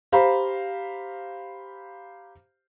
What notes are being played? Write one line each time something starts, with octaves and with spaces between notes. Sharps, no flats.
G4 C5 F5 A#5 B5